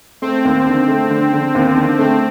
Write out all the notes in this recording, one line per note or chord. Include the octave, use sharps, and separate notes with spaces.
A3 C4
D#2
D3
A3
D3
D3
D#2
D3
A3 C4